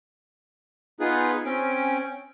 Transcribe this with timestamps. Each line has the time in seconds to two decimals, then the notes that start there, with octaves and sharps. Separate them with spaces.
1.00 B3 D#4 F4 G#4 B4
1.45 C4 C#4 G5